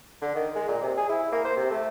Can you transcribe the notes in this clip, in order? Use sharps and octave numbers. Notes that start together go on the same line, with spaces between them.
D3
D#3
G#3
A#2
C3
G#4
E4
A#3
C5
C3
A3